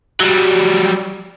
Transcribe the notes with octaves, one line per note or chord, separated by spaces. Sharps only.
F#3 G3